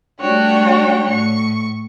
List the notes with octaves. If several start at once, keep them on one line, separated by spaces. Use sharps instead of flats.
G3 A3 D4 F#4 C#5 G5
A2 C#6